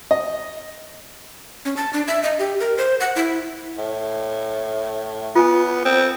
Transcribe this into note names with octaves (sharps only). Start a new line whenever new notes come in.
D#5
C#4
A5
D4
E5
D#5
G4
A#4
C5
F#5
E4
A2
B3 F4 G#5
C4